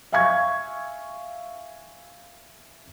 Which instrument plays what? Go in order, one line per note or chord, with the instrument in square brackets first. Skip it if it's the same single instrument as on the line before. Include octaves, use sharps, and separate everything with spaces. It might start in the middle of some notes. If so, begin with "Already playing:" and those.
[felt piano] E5 F5 G#5 C#6 G#6